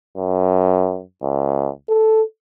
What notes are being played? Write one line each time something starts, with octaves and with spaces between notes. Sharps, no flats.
F#2
C#2
A4